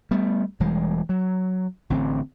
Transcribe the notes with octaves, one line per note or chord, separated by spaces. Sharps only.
G3 A3 B3
E1 E3 G3 G#3
F#3
A1 D3 C4